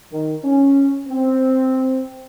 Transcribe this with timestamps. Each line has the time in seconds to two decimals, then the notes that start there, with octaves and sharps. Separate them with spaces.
0.13 D#3
0.44 C#4
1.09 C4